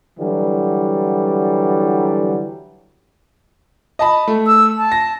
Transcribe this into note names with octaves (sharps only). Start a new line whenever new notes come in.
D3 E3 F#3 G3
D#5 A5 B5
A3
E6
A5
A#6